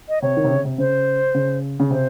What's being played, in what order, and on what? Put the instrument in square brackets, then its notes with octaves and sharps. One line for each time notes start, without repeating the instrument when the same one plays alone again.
[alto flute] D#5
[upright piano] C3 [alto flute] C#5
[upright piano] D#3
C3
C#3
C3
[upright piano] C#3 [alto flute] C5
[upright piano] C#3
C#3
[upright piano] C3 [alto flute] C5